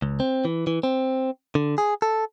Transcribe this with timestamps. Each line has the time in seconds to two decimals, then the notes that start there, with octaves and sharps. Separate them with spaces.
0.02 C#2
0.20 C4
0.45 E3
0.67 E3
0.83 C4
1.55 D3
1.78 G#4
2.02 A4